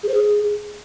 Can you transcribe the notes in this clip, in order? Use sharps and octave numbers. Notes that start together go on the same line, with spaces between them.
G#4
C5
G#4